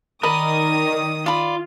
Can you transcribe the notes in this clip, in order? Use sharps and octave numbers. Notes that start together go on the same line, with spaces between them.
D#3 A#4 D5 D#5 B5 D#6
F4 D5 B5